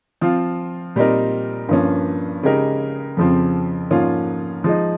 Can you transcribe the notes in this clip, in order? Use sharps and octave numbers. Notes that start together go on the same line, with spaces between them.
F3 C4 F4
A#2 G3 C4 D#4 A#4
G2 F3 A#3 C#4
C#3 G#3 D#4 G4 A#4
F2 C#3 F3 C4
G#2 F3 A#3 C#4 F4
F3 G#3 D#4